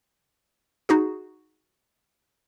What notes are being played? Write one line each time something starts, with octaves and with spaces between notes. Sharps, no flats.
D#4 F#4 G#4